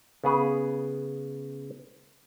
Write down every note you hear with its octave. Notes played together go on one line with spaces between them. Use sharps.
C#3 B3 G#4